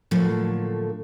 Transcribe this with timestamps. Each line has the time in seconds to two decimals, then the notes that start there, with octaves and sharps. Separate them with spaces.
0.11 A2 D3 F3 F#3 A3 A#3